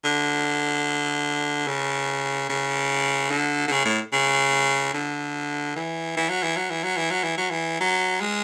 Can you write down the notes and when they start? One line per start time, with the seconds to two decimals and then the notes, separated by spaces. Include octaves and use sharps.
0.05 D3
1.67 C#3
2.49 C#3
3.31 D3
3.68 D3
3.72 C#3
3.85 A2
4.13 C#3
4.94 D3
5.76 E3
6.17 E3
6.30 F#3
6.43 E3
6.57 F#3
6.70 E3
6.84 F#3
6.97 E3
7.11 F#3
7.24 E3
7.38 F#3
7.50 E3
7.80 F#3
8.21 G#3